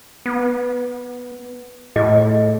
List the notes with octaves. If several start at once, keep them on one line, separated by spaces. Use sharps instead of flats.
B3
A2 G#4 D#5